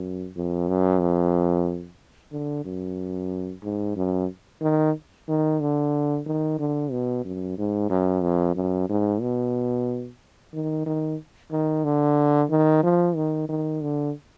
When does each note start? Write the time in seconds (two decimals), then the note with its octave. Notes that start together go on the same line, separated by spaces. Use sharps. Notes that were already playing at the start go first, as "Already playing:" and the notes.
Already playing: F#2
0.36 F2
0.68 F#2
1.01 F2
2.32 D3
2.65 F#2
3.63 G#2
3.96 F#2
4.61 D#3
5.28 D#3
5.61 D3
6.26 D#3
6.59 D3
6.91 B2
7.24 F#2
7.58 G#2
7.90 F#2
8.22 F2
8.55 F#2
8.89 G#2
9.21 B2
10.53 D#3
10.86 D#3
11.51 D#3
11.84 D3
12.50 D#3
12.83 F3
13.15 D#3
13.49 D#3
13.81 D3